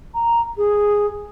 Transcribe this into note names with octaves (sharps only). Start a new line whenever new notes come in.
A#5
G#4